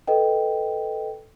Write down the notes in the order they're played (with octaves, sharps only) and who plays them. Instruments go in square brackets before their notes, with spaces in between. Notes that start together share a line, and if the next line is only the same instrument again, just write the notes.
[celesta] A4 B4 D#5 G5